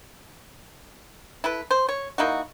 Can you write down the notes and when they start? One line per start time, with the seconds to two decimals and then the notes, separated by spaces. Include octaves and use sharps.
1.44 E4 A4 B4
1.71 C5
1.89 C#5
2.18 A#3 D#4 E4 F#4